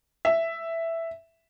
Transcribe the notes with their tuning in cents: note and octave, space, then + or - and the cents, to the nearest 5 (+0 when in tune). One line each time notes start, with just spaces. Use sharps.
E5 +5